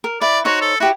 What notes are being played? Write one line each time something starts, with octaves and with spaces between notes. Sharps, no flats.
A#4
E4 B4 D5
D#4 F#4 C5 C#5
A4
E4 F#4 G4 F#5